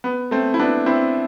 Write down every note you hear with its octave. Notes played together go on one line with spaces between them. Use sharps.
B3
A3 C4
E4
B3 D4
C4 E4